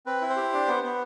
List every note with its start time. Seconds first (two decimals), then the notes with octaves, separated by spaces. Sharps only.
0.06 C4 B4
0.22 E4
0.30 C5
0.37 G4
0.53 D4
0.68 B3
0.84 B3